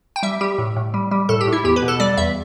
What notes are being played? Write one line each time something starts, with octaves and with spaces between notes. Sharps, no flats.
G5
G3 E5
G3 G4
A2
A2
G3
G3
A2 A4
G4
A2
E4
E2 G4
B4
B2
A4
G3 D5
E2 E5